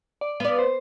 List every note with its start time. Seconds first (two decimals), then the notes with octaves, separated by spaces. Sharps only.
0.21 D5
0.40 B3 D5 F5
0.59 C5